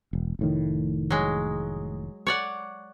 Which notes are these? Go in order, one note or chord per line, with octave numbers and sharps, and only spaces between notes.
E1
F1 A2 D#3
F#3 G#3
C#5 D5 F#5